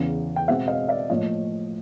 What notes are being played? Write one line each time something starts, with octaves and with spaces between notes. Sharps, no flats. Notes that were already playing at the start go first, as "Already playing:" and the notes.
Already playing: E2 C#3 E3
G5
B2 G#3 C4 E5 F#5
D#5 F5
D5 E5
A2 F3 A#3 C#5 D#5